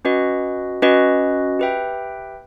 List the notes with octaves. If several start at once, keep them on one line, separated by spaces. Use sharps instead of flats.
C#4 F#4 B4 D#5
C#4 F#4 B4 D#5
G4 B4 E5 G5